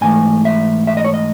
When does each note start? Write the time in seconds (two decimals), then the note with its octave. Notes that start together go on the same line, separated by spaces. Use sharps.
0.01 G#2 E3 A3 G#5
0.45 E5
0.87 E5
0.97 D#5
1.04 C#5
1.14 D#5